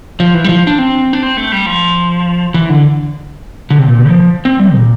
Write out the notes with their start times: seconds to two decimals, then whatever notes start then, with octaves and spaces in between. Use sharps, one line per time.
0.20 F3
0.35 E3
0.44 G3
0.49 F3
0.67 D4
0.78 C4
1.13 D4
1.23 C4
1.37 A3
1.52 G3
1.66 F3
2.54 E3
2.69 D3
3.70 D3
3.79 C3
3.86 A#2
4.08 F3
4.45 C4
4.59 G3
4.74 A#2